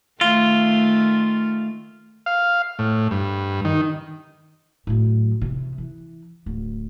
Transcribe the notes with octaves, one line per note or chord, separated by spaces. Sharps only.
D#3 A3 F4
F5
A2
G2
D#3
A2 F#3
C3 E3
E3
D1